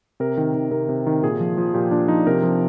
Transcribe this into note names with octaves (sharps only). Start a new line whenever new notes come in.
C3 A#4
D#3
D#3
C3 A#4
C3
D#3
A#2 G#4
F3
F3
A#2 G4
A#2 D4
F3 D#4
C3 A#4
F3